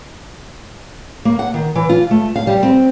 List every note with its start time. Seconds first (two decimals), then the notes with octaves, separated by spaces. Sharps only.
1.25 A#3
1.39 F#5
1.54 D#3
1.75 E3
1.89 F4
2.11 A3
2.36 F5
2.47 G3
2.63 C4